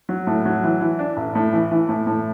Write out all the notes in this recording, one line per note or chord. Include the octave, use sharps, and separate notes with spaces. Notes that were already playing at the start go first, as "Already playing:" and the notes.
F#3
A2
F#3
E3
E3
D4
A1
A2
E3
E3
A2
A2